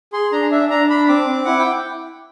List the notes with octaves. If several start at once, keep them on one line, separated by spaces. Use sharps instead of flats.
G#4 C6
D4 A#5
D4 E5
D4 A#5
D4 B5
C4 D6
C4
E4 F#5
G5